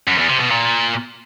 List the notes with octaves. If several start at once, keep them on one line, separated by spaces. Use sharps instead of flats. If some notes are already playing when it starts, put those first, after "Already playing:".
F#2
E2
C3
B2
A#2